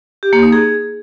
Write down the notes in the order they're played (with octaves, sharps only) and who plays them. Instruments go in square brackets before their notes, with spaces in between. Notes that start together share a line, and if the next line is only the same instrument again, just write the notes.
[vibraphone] G4
A#3
D#4
G#4